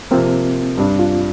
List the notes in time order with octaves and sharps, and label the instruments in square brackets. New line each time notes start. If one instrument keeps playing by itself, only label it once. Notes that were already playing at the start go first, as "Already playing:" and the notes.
[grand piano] C3 F3 A#3 [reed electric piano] C4
[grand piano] G2 G3 D4
[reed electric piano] F4